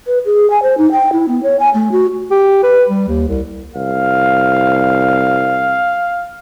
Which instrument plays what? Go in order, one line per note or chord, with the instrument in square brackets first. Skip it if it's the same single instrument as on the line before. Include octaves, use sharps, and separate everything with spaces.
[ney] B4
G#4
G#5
C5
D#4
G5
E4
B3
C#5
G#5
A3
F#4
[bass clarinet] G4
B4
G3
D#2
C2
[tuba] C2 [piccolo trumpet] F5